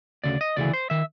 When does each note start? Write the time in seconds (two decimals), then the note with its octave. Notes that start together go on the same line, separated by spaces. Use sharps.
0.24 D2 C#3 D5
0.41 D#5
0.57 D2 C#3 E3 D5
0.73 C5
0.90 D#3 E5